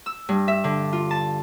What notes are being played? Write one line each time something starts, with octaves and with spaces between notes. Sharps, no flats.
E6
G2
E5
D3
F4
A5